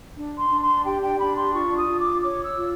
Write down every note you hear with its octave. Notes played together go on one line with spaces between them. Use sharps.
D4
C6
D4
C6
G4 G5
G5
D4 B5
C6
F4 C#6
D#6
F4
D6
C#5 D6
E6
F4